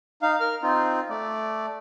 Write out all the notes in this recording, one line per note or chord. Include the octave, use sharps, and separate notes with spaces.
D#4 F5
A#4 F6
C4 D#4 F4
A3 D5